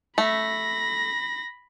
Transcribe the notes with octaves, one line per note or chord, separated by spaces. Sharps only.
A3 B5 A#6